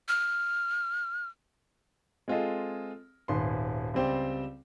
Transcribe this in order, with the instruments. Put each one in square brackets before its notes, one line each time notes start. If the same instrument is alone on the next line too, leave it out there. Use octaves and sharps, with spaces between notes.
[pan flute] F6
[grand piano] G#3 C4 F4 G#4 A4 D#5
D#1 G#1 B4 C6
C#2 G3 C4 C5 D5